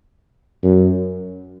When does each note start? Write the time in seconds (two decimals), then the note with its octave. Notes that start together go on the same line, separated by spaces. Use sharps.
0.63 F#2